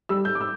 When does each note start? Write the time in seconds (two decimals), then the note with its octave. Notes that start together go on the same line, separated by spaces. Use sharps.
0.09 G3 E6
0.25 G6
0.35 D6
0.41 E6